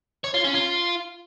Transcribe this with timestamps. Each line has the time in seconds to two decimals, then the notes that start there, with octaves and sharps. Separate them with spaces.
0.24 C#5
0.34 F4
0.44 C#4
0.54 F4